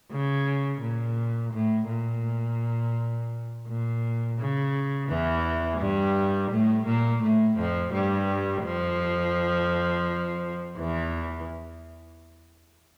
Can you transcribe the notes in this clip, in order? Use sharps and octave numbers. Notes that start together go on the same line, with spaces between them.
C#3
A#2
A2
A#2
A#2
C#3
E2 E3
G2 G3
A2 A3
A#2 A#3
A2 A3
F2 F3
G2 G3
F2 F3
E2 E3